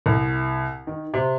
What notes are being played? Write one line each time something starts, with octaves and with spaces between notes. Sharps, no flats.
C2
D#3
C3